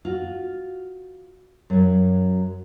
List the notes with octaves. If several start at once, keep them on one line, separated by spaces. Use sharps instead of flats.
F4 F#4
F#2 F#3